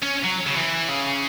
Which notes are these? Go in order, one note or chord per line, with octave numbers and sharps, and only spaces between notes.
C#4
F#3
C#3
E3
C#3